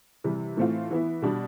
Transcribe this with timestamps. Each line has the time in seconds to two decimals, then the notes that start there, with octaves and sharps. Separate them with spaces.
0.24 C3 E3 G3
0.57 A2 E3 A3 C4 F4
0.91 E3 B3 E4
1.22 B2 G3 D4